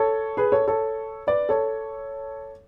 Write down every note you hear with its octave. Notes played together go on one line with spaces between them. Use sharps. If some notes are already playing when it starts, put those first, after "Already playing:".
Already playing: A4 C#5
G#4 B4
A4 C#5
A4 C#5
B4 D5
A4 C#5